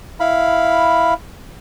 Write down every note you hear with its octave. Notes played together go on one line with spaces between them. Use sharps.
E4 F5 B5